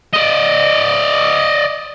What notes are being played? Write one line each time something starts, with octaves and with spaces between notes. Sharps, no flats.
D5 D#5